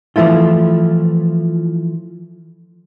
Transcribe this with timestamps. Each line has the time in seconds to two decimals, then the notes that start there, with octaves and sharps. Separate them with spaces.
0.16 E3 F3 A3 E4 F4